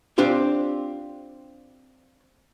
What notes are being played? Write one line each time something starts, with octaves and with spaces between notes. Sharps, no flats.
C4 D4 F4 G4 C5